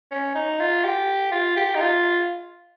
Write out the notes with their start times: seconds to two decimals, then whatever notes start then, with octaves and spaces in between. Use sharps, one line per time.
0.12 C#4
0.35 D#4
0.60 F4
0.85 G4
1.32 F4
1.57 G4
1.75 D#4
1.80 F4